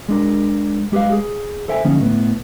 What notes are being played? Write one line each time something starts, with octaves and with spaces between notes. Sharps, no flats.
G#3 D4 A#4
G#3 G4 G#4 B4 F5
G#4
A4 C5 E5 G5 G#5
D3 F3 A#3 C#4 D#4
A2 B3